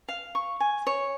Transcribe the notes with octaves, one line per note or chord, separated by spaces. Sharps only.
F5
C#6
G#5
C#5